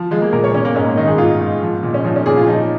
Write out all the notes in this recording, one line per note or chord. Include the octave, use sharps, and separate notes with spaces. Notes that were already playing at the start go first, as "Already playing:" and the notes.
Already playing: F3
F3 G#3
A#3
A#2 A#4
C#5
A#2 C#4
A#3
G#2 C#4
A#3
D#3 D#4
G#4
G#2 F4
G#2
F3
A#2
C#4
F3 D#4
C#4
A#2 G#4
F4
F3 D#4